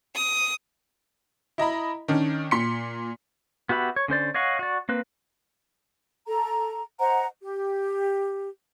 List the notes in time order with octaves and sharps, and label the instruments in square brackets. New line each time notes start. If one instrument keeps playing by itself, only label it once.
[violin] D#6
[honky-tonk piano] E4 D#5 A#5 B5
D#3 C#4 D4
A#2 C6 B6 C#7
[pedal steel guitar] B3 F#4 G4 E5 B5
C#5
D3 C#4 C5 D5
C#5 D#5 F5 F#5 C#6
F#4 D5
A#3 C4 B4
[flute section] A4 A#5
C5 D#5 F#5 A#5
G4